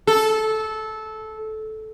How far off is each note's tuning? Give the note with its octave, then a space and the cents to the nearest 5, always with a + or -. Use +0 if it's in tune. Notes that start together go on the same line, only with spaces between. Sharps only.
A4 -15